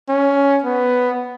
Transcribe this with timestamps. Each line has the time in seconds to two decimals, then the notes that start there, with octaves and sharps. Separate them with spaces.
0.09 C#4
0.64 B3